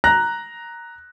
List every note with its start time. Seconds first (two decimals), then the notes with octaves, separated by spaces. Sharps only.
0.04 A#5 F#6 A#6